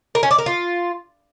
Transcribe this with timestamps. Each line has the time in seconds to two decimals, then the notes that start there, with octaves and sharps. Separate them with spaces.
0.15 A#4
0.23 C#4
0.31 D5
0.38 A#4
0.46 F4